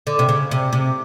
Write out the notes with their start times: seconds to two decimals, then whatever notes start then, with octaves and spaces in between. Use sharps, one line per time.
0.07 D3
0.19 C3
0.29 C#3
0.51 C3
0.73 C3